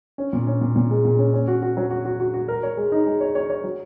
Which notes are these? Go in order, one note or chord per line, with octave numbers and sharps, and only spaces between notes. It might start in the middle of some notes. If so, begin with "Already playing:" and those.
C#4
A#2
C#4
A#2
A#2
G#3
A#2
C#4
C#4
F#4
F#4
F#3
F#4
F#4
F#4
F#4
A#4
C#5
G#3
D#4
G#3
C#5
C#5
C#5
F#3